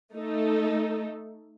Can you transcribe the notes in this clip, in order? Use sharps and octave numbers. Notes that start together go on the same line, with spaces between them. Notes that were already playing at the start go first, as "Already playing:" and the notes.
A3 D#4 A4